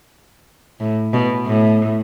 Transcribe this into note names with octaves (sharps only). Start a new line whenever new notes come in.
A2
B2
A2